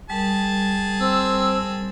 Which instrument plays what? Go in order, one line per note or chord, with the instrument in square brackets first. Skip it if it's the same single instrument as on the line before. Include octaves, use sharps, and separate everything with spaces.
[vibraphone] G3 A#4 [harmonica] G#4 A5
[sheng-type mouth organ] C4 E6